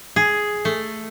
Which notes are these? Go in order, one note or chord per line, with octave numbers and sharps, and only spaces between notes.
G#4
A3